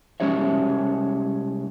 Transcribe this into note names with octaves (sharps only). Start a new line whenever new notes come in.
C2 G#3 C#4 G4 C#5 E5